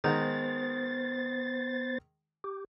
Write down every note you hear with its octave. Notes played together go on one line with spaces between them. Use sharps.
D#3 G#3 B3 C5 A#5 A6
G4